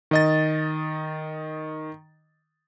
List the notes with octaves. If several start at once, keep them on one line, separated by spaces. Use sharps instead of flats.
D#3 D#5 A6